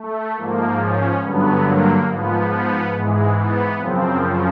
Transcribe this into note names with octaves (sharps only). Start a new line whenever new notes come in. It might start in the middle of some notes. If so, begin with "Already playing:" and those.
Already playing: A3
G#2 F3 A#3
C#4
G2 D3 F#3 B3
A#3
G#2 F3 B3
B3
G#2 E3 G#3
B3
F#2 C#3 F3 C4
C#4